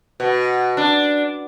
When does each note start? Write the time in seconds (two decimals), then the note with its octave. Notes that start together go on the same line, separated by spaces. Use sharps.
0.20 B2
0.77 D4